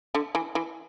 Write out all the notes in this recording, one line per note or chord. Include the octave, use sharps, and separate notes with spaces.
D3
E3
E3